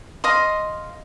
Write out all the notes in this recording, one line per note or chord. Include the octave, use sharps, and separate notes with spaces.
D#5 F5 C6